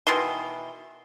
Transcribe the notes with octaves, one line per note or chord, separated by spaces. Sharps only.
B2 D#3 E3 C6